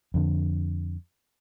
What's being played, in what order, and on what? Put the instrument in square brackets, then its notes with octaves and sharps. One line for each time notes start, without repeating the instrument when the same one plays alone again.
[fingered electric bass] F2 D3